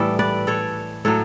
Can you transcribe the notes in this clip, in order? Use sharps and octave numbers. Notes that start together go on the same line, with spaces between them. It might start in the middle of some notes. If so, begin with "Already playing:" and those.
Already playing: A2 E3 G3 A4
B4 D5
A4 C#5
A2 F#3 A4 C#5